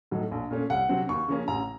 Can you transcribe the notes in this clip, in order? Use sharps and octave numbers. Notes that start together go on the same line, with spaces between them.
A2 F#3 A3 D#4
A#1
A#2 A3 C#4
C2 F#5
C3 F#3 C4
D#2 C#6
C#3 F3 A#3 C#4
A1 A#5